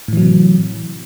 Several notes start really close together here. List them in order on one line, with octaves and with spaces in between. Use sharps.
A2 E3 F#3 C3